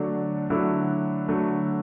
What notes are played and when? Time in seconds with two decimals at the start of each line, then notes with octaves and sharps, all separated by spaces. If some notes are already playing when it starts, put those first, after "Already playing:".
Already playing: D3 F#3 A3 D4
0.50 D3 F#3 A3 E4
1.28 D3 F#3 A3